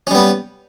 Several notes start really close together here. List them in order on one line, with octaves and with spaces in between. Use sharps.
C#4 G3 B3